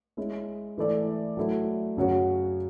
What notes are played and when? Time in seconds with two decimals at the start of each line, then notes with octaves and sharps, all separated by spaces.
0.17 G#3 C#4 E4
0.78 E3 A3 E4 A4 D5
1.37 F#3 A3 E4
1.97 F#2 C#3 F#3 C#4 F#4